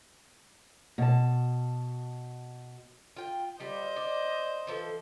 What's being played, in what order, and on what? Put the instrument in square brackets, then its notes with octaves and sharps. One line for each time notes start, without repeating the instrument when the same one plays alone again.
[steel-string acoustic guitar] B2 A5
[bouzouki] F4 G5
[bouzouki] G3 F4 [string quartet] C5 D#5 G6
[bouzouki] D5
E3 F3 A4